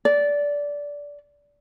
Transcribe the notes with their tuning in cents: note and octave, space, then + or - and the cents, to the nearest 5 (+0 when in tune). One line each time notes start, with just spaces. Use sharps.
D5 -15